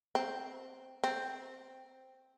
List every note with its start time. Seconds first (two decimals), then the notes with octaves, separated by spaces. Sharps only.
0.15 C4
1.04 C4